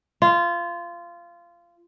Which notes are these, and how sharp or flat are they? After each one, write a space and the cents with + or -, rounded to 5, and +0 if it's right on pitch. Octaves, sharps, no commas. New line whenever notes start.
F4 -20